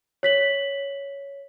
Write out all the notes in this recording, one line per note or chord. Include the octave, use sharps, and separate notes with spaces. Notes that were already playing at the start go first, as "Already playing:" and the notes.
C#5 B6 F#7